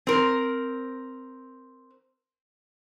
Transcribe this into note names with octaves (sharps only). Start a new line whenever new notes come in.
C4 A#4